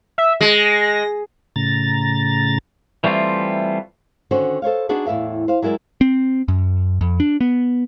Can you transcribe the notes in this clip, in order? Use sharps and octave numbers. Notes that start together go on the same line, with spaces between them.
E5
G#3 A#6
A2 C#3 A#5 A6
E3 G3 A3 C4 F4
D3 D#3 C#4 F#4 C5 C#5
A4 C5 C#5 F5
B3 D4 D#4 F#4 G#4 B4
E2 A2 E5 F5
C5 F5
F#3 G#3 E4 A#4 D5
C4
F#2
F2
D4
B3